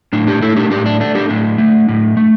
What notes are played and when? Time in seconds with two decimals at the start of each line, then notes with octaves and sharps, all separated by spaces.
0.13 A2 D4
0.27 D4 G4
0.42 A3 E4 A4
0.56 D4 G4
0.71 A2 D4 G4
0.86 D4
1.00 A3 D4
1.15 D4 G4
1.29 A2 D4
1.58 A3
1.89 A2
2.17 A3